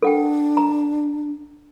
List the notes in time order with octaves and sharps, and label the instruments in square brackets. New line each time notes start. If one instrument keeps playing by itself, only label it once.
[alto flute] D4 [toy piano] A4 F#5 G5
[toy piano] A#5